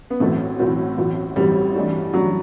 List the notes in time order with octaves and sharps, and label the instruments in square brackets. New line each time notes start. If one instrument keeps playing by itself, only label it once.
[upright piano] B3
[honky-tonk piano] A1 A2 F#3 C4 F#4 [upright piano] A3
[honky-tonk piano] A1 A2 F#3 C4 F#4
A1 A2 F#3 C4 F#4
[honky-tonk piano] A1 A2 F#3 C4 F#4 [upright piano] G3
[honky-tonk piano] G2 E3 A3 D4 F#4
[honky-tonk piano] E3 A3 D4 F#4 [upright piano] F#3